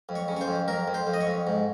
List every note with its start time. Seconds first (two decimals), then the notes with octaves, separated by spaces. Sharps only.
0.09 F2
0.15 C#5
0.28 C#3
0.36 C#5
0.41 C5
0.48 F2
0.68 F2 A#4
0.88 F2
0.94 C5
1.07 F2
1.14 D#5
1.21 C#5
1.27 F2
1.47 G#2